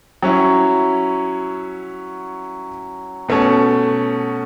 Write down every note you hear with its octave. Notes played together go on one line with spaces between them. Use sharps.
F#3 C#4 E4
B2 A3 C#4